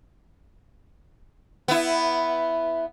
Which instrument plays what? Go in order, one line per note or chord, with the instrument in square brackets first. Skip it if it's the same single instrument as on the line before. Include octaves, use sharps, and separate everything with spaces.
[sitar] B3 E4